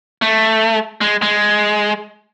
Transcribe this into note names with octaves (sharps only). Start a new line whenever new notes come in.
A3
G#3
G#3